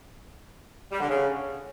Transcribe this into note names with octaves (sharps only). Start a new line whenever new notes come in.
G3
D3
C#3